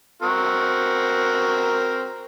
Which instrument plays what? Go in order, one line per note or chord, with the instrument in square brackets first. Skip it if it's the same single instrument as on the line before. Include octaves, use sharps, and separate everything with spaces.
[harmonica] C4 F#4 A#4